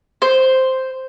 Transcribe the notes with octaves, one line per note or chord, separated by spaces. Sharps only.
C5